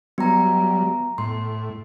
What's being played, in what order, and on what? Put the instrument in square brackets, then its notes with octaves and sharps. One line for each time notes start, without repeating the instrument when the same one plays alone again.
[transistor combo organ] F#3 G3 [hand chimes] B3 A#5
[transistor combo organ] A2 [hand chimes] C6